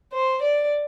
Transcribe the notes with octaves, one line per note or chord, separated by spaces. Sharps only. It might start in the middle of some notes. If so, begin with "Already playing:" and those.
C5
D5